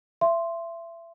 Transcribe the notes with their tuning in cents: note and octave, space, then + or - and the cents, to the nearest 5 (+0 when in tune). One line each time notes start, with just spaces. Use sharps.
E5 +30 C6 +0